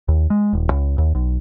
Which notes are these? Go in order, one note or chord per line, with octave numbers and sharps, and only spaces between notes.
D#2
G#3
D#1
C#2
D#2
B1